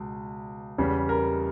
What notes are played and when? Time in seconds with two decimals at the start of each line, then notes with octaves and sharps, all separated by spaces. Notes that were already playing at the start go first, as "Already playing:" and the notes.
Already playing: C#2 B2
0.78 E2 C#3 G3
1.09 A#4